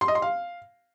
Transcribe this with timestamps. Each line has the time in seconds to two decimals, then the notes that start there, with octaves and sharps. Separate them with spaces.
0.01 C6
0.08 D#5
0.15 C6
0.22 F5